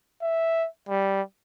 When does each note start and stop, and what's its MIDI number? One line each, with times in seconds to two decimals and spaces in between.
0.22 0.67 76
0.89 1.21 55